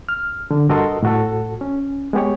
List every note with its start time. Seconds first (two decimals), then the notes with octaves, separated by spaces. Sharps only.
0.09 F6
0.51 D3
0.69 G2 F#4 A4 A#4 D#5 C6
1.03 A2 F#4 A4
1.61 C#4
2.13 G#3 B3 G4 C#5